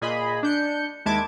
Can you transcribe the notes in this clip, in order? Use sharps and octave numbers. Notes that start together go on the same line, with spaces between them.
A#2 G#4 D#5 B5
D4 G6 C#7
D#2 G#3 E4 A5 D6 G#6